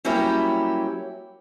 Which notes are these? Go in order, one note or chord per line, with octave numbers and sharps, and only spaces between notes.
F#3 G3 A#3 C#4 E4 G4